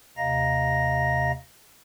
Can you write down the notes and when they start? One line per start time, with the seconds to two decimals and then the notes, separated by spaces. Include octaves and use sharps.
0.17 D#2 C3 D#5 F5 A#5 A#6